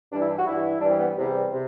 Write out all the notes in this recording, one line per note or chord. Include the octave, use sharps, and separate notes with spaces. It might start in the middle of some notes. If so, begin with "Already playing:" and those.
G2 E3 G3 D4
E4
D4
F#4
G2 E3 G3 E4
G2 E3 G3 D4
C4
B3
E2 C3 G3
C3